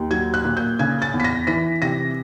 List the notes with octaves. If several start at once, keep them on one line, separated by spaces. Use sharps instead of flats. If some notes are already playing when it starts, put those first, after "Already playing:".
Already playing: D#2
F#3 G#6
F#6
A#2
G6
C#3 G#6
A6
E2
B6
A#6
E3 B6
C3 A#6